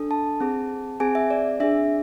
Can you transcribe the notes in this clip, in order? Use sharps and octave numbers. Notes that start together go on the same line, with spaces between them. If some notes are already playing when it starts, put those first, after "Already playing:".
Already playing: D4 A4
A5
C4 G#4
C4 G#4 G#5
E5
D5
D4 G#4 E5